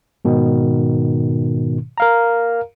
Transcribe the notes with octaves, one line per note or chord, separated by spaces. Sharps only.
G#2 B2 D#3
A#4 F5 A#5